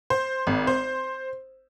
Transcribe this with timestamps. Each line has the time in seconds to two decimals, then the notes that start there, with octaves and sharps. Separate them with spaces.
0.10 C5
0.47 G#1
0.67 C5